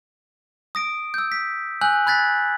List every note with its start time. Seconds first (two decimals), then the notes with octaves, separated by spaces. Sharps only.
0.75 D#6 A#6 D7
1.14 E6 G6
1.32 B6
1.81 G#5 E6 F#6 G6 F#7
2.07 B5 F#6 G#6 A6 B6